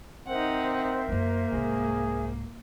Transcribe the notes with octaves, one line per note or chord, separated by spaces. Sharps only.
C4 D#4 A#4 C5 E5 F#5
F#2 F#3 A#3
C2 G#2 G#4